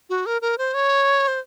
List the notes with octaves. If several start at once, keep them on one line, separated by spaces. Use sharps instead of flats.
F#4
A#4
A#4
C5
C#5
C5